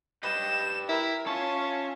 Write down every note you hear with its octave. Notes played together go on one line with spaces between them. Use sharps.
G4 B4 D#5 E7
E4 A#4
C#4 F4 C#5 E5 A5